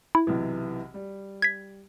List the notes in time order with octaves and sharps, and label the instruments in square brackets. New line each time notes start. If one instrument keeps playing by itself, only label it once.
[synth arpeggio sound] E4
[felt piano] B1 C3 E3
G3
[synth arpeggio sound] G#6 B6